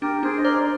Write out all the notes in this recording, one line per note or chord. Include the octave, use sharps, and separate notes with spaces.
D4 G4 A#4
D4 G#4 C5
D#5
A#4 C5 D5